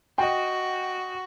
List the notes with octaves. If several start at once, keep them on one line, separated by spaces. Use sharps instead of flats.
F#4 D#5 G5